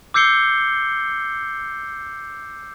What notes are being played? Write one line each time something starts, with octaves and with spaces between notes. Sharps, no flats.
D6 E6 G6 C7 C#7 G7